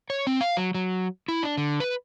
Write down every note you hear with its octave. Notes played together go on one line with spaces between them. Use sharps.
C#5
C4
F5
F#3
F#3
E4
D4
D3
B4